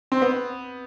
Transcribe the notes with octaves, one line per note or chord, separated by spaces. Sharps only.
C4
B3